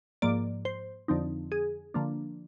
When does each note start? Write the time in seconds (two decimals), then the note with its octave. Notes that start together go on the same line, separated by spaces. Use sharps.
0.22 G#2 F3 A#3 D5
0.65 C5
1.08 F2 D3 F3 C4 D#4
1.52 G#4
1.94 D3 F3 A#3 D4